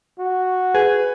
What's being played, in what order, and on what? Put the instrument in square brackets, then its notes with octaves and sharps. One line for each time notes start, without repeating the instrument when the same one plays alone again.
[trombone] F#4
[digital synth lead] G#4 [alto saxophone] B4